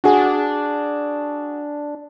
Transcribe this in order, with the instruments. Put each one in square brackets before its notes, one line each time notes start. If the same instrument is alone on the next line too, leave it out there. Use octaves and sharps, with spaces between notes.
[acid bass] D4 [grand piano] F#4 G#4